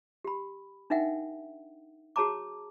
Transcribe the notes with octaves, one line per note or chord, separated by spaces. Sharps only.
G4 B5
D4 D#4 A#4 E5 F#5 G5
F#4 G#4 C#5 A5 A#5 D6